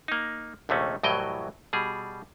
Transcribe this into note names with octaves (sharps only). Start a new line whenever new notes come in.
A#3 D#4
A#1 D#2 C3 A3 C#4
C2 A2 E3 F#3 D#5 G5
B2 G3 G#4